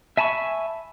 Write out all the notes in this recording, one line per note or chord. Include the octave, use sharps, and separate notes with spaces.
E5 G#5 A5 B5 C#6